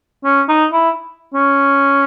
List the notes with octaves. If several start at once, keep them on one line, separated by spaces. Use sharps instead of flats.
C#4
D#4
E4
C#4